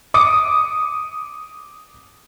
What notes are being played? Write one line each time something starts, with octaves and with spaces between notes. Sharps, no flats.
D6 D#6 C#7